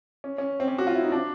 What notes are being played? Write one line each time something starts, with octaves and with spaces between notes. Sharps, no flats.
C#4
C#4
C4
C#4
F#4
F4
E4
D#4
D4